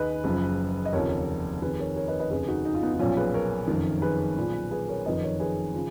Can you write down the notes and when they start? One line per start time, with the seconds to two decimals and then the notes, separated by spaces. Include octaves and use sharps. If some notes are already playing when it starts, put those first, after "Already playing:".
Already playing: D#2 D#3 G#4 B4 D#5
0.24 F#1 F#2 C#3 F3
0.85 D#5
0.93 F1 D#2 C#3 F3 A#4 C#5
1.62 F1 F2 D#3 G#4 B4
1.79 A#4 C#5
1.96 A#4 C#5
2.08 B4 D#5
2.20 B4 D#5
2.30 F1 D#2 C#3 G#4 B4
2.48 D#4 F#4
2.65 D#4
2.75 F4
2.83 B3 D#4
2.94 D#4
2.99 B1 A#2 F3 C#4 F4
3.17 G#4 B4
3.34 A#4 C#5
3.68 F#1 F2 D#3
4.02 G#4 B4
4.36 B1 A#2 F3
4.71 G#4 B4
4.88 A#4 C#5
5.06 F#1 F2 D#3 B4 D#5
5.23 A#4 C#5
5.39 G#4 B4
5.74 C#3 F3